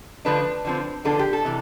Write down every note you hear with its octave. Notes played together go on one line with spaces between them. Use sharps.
D3 F3 A3 D4 B4
D3 F3 C4
D3 F3 B3 D4 A4
G4
A4
C3 E3